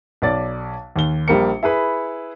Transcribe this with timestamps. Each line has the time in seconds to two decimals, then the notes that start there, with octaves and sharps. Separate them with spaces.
0.22 B1 C#5 D5 A6
0.96 D#2 G7
1.28 A#1 G3 A#3 A#4 C#7
1.63 E4 G#4 B4 B5